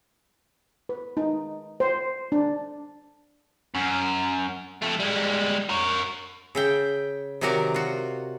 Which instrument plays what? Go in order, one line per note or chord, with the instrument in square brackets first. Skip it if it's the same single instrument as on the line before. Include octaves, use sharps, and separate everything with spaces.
[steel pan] B4
D#4
C5
D4
[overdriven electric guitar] F#2
F2 A3
G3 G#3
A#4 C#5
[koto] C#3 E5 G5
C3 D#3 F#3 F#4 A#4 D5
F4 F#4